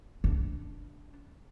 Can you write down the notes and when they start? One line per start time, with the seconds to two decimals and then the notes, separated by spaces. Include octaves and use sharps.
0.24 D4